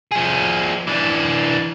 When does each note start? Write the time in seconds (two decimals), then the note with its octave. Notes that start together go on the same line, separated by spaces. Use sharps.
0.12 F3 G#4
0.87 E3 D4